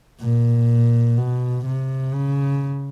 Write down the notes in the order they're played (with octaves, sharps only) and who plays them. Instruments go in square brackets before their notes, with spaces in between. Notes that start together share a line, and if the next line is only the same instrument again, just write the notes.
[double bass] A#2
B2
C3
C#3